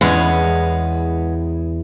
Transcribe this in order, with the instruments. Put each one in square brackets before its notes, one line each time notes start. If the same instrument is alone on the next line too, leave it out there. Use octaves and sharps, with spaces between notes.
[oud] E2 [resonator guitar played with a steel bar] G#3 B3 C#4